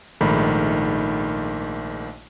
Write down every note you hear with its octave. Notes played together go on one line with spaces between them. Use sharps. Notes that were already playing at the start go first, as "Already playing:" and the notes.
A#1 G#2 D#3 A3 B5